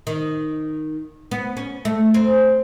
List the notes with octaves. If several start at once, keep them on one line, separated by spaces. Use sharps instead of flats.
D#3
B3
C#4
A3
C4